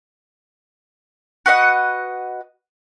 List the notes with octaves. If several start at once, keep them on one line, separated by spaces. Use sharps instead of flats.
F#4 B4 D#5 F#5